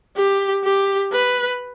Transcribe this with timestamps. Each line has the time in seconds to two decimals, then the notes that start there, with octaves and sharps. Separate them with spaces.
0.16 G4
0.64 G4
1.12 B4